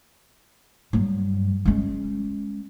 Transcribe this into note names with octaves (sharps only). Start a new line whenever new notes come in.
G2 F#3
G#3 C#4